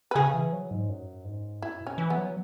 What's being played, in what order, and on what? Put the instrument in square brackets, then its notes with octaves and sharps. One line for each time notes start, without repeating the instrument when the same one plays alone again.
[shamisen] B4
[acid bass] C#3 [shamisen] G#4
[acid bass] E3
F#3
G#2
F#2
G#2
[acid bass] F#2 [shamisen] E4
[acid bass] B2
[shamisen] C#4
[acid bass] E3
[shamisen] B3
[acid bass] F#3